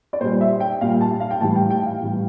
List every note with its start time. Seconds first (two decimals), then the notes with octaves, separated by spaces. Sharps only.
0.13 D5
0.20 A#2 C5
0.24 G3
0.41 E5
0.60 G5
0.81 A#2 G3 F5
1.01 A5
1.20 F5
1.31 G5
1.41 A2 E3 G3 A5
1.56 G5
1.70 G5
1.86 F5
2.01 A2 E3 G3